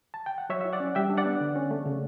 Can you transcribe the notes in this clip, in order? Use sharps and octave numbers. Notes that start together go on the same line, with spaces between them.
A5
G5
F#5
F#3 C#5 E5
E4 E5
D5 F#5
C#4
G3 E5 G5
D4
D5 F#5
B3
D3
C#4
A3
C#3